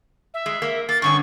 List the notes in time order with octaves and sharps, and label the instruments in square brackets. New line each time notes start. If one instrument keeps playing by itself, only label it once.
[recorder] E5
[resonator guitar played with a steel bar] G#3
A#3
[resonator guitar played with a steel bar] A#3 [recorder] A6
[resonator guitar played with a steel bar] G2 D3 C#4 [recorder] C#6